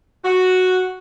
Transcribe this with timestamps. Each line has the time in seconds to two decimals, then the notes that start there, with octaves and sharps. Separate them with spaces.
0.24 F#4